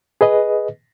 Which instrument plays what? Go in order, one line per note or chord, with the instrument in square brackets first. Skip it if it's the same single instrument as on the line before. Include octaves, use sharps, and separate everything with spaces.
[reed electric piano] G#4 B4 D#5